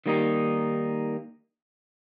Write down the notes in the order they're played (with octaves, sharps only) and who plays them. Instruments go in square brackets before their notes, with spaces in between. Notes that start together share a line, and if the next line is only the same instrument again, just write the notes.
[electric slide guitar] D#3 G3 A#3 D#4